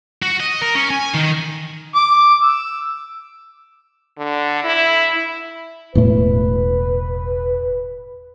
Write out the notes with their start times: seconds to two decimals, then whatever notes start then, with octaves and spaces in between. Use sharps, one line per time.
0.22 F#4
0.40 D#5
0.62 A#4
0.75 C#4
0.90 G#5
1.14 D#3
1.95 D6
2.42 E6
4.18 D3
4.64 E4
5.95 E1 A2 A3 B4